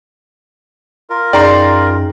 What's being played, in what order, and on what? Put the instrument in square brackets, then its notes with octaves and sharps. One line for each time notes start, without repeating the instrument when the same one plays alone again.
[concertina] F4 A#4
[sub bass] F#2 [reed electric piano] D#4 G#4 G5 [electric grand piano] D5 A#5 C6